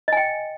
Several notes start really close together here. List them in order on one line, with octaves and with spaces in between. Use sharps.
D#5 G#5 G5